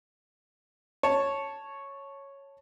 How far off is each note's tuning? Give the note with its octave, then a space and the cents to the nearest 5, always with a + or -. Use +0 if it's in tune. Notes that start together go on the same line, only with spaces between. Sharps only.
C#5 -5 A5 +0